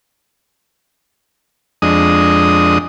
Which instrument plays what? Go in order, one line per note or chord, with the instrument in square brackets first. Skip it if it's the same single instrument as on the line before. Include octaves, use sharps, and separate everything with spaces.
[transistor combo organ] F2 G#3 D4 D#5 D#6